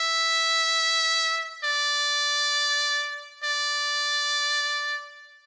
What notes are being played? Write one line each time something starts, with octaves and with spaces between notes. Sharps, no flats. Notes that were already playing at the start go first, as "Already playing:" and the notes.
Already playing: E5
D5
D5